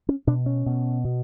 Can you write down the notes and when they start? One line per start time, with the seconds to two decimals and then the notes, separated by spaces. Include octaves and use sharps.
0.09 C#4
0.27 B2 D4
0.46 C#4
0.66 B2
1.04 B2